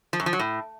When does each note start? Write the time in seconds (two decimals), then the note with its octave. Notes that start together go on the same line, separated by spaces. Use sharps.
0.13 F3
0.20 F#2
0.26 F3
0.33 F#3
0.39 A2